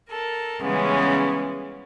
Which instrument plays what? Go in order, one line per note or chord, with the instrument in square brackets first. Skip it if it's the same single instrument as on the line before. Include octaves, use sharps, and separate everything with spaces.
[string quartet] A4 A#4
C#3 E3 G3 G#3 B3 C#4